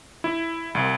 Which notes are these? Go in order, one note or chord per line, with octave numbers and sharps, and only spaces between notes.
E4
C2